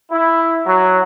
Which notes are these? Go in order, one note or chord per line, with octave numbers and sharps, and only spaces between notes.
E4
F#3